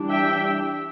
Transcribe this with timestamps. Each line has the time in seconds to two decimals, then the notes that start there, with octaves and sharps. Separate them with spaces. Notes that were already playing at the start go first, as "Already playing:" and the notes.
Already playing: E3 G3 D4
0.09 E5 G5